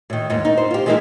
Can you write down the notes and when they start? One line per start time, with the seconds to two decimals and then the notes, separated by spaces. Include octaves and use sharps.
0.10 A2 D#3
0.30 D#2 G#2
0.45 D#4
0.57 C5
0.71 F4 G4
0.86 E3 F3 G#3 A#3 D#4 E4